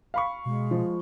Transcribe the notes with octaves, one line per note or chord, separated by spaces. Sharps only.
F5 B5 C#6
B2 G#3
F3